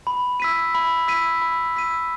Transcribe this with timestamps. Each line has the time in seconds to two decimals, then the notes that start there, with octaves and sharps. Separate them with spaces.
0.07 B5
0.40 E6 B6 D#7
0.75 B5
1.08 E6 B6 D#7
1.42 B5
1.76 E6 B6 D#7